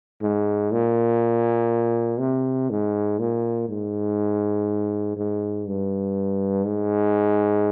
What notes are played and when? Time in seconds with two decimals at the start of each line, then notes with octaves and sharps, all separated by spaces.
0.22 G#2
0.72 A#2
2.20 C3
2.70 G#2
3.19 A#2
3.69 G#2
5.17 G#2
5.67 G2
6.66 G#2